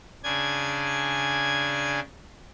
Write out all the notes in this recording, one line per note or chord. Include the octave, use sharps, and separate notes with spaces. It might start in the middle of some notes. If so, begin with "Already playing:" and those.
C#3 D4 G#5 G#6